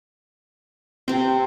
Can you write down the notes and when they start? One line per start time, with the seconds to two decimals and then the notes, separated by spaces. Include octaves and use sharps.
1.08 C3 C4 G5